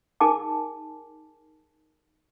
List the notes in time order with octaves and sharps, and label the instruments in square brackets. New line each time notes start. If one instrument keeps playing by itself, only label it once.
[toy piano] D#4 G#4 A#4 G#5 A5 D6